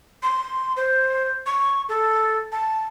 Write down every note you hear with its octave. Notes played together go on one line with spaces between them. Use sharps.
C6
C5
C#6
A4
A5